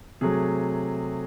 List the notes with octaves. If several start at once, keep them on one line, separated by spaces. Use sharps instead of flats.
C3 F#3 A3 G#4